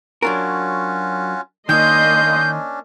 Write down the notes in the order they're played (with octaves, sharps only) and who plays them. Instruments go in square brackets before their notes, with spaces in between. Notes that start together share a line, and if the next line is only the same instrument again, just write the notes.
[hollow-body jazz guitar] F#3 D4 A#4 [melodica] C#4 F4 F#4
[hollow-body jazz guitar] D#3 [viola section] A#3 D#5 C6 [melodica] C#4 D4 [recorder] G6